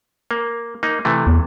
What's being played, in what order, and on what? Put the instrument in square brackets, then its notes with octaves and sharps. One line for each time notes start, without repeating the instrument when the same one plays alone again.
[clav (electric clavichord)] A#3
A#3 D#4
C3 E3 A3
[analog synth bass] E2